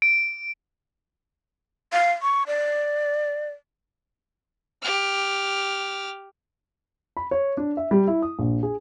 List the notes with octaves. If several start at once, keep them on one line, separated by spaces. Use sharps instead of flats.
D7
F5
C#6
D5
G4 F6
B5
C#5
D4
E5
G3
E4
D#6
A#1
G#4